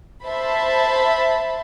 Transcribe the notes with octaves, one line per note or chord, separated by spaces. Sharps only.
C5 E5 A5 B5